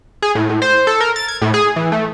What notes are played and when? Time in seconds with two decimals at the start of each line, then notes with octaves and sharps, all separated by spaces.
0.22 G#4
0.35 A2
0.49 A2
0.62 C5
0.87 A4
1.00 A#4
1.16 A6
1.28 G#6
1.42 A2
1.54 G#4
1.76 E3
1.92 A3